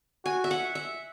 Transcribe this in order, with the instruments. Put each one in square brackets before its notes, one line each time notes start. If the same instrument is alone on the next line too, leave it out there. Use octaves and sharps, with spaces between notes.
[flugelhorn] F#4 [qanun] G#5
[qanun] E5
F#5
E5